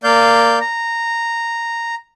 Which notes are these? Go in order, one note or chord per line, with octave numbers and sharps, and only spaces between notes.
A#3 D5 F5 G6
A#5